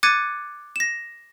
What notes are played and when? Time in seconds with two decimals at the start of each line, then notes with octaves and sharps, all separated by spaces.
0.03 D6 F#6 G#6 A6 C#7 D#7
0.76 A#6 E7